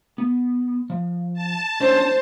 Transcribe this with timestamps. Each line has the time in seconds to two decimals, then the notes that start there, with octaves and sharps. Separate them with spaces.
0.18 B3
0.90 F3
1.34 A5
1.80 C#4 D4 C5 C#5